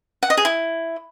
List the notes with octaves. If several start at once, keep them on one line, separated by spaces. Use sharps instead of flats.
F#5
D#5
G#4
E4